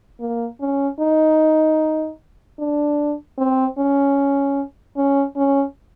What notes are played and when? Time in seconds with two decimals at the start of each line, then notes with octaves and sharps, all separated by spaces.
0.20 A#3
0.61 C#4
1.00 D#4
2.59 D4
3.38 C4
3.78 C#4
4.97 C#4
5.36 C#4